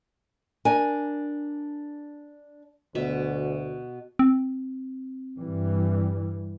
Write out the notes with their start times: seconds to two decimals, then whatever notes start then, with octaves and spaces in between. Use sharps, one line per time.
0.65 D4 A#4 G#5
2.95 D2 B2 E5
4.19 C4
5.37 G2 E3 G3